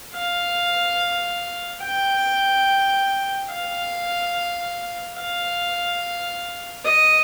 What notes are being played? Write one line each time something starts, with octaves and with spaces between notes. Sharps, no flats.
F5
G5
F5
F5
D#5